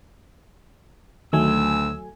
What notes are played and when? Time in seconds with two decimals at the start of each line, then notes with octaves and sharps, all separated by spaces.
1.33 D2 D#3 F#3 A3 G#5 E6